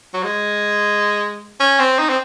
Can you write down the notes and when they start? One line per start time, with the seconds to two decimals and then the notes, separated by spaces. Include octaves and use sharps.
0.14 F#3
0.23 G#3
1.60 C#4
1.80 C4
1.99 D#4
2.09 C4